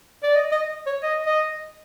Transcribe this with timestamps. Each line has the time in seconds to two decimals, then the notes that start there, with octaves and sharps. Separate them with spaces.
0.23 D5
0.35 D#5
0.51 D#5
0.86 C#5
1.03 D#5
1.26 D#5